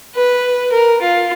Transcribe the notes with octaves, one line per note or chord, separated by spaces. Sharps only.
B4
A#4
F4